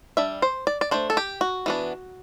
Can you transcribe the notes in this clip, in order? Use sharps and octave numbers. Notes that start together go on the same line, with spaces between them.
G3 D4 E5
C5
D5
D5
A3 D4 C5
A4
G4
F#4
E3 B3 D4